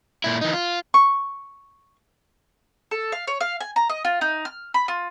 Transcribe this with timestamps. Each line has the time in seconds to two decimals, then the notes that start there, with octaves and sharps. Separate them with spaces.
0.24 A#2 E4
0.41 E3 D#4
0.53 F4
0.94 C#6
2.91 A4
3.12 F5
3.27 C#5
3.41 F5
3.60 G#5
3.76 A#5
3.90 D#5
4.05 F4
4.21 D#4
4.45 F6
4.74 B5
4.88 F4